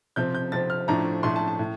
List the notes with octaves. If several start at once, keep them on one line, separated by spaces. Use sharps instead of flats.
C3 F3 C4 G6
G6
C3 F3 C4 A6
F6
A2 F3 A3 D4 A#5
A2 F3 A3 D4 C6
A5
A5
A2